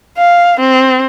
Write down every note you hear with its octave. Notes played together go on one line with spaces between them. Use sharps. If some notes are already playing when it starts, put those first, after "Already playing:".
F5
C4